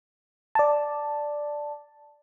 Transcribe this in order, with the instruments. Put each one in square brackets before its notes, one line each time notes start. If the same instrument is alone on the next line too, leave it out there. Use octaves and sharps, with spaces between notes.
[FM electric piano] D5 A5